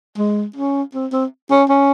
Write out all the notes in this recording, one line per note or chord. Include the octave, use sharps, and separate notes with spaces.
G#3
C#4
C4
C4
C#4
C#4